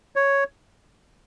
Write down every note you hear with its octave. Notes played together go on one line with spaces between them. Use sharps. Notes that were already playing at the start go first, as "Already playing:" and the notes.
C#5